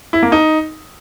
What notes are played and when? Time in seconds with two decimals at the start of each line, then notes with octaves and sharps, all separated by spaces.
0.13 E4
0.23 A#3
0.32 D#4